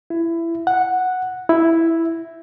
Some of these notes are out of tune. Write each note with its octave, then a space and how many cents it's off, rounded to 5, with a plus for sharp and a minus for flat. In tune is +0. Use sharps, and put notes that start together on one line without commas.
E4 +20
F#5 -5
E4 +0